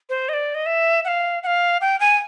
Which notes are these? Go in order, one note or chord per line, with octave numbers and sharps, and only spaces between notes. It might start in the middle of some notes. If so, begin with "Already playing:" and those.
C5
D#5
D5
D#5
E5
F#5
F5
F#5
F5
G5
G#5